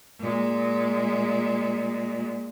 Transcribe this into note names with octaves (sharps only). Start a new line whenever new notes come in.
A#2 G#3